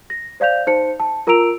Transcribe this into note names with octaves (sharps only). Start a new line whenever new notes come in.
A#6
C5 D5 F5 G6 F7
D#4 C5 A5 C#7
A5
F4 A#4 A#5 E6 D7 F7